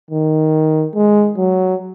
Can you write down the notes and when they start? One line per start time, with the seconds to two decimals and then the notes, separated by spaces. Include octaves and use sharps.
0.10 D#3
0.94 G#3
1.37 F#3